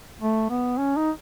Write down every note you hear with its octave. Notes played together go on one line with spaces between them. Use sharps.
A3
B3
C#4
D#4